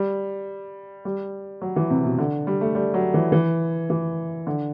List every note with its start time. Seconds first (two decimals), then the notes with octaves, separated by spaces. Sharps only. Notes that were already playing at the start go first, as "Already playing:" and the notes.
Already playing: G3
1.05 G3
1.62 F#3
1.76 E3
1.90 C3
2.05 B2
2.18 D3
2.47 G3
2.61 A3
2.75 G3
2.94 F#3
3.14 E3
3.32 E3
3.90 E3
4.47 D3